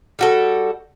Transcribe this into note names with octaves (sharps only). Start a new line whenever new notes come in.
G3 F#4 A4